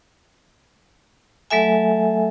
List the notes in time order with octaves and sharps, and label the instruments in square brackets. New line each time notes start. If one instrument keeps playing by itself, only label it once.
[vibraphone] F#3 A3 A4 E5 G#5